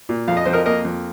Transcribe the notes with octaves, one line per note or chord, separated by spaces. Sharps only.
A#2
F2 F5
D#5
F2 C5
A#4 D#5
A#3 A#4 D#5
F2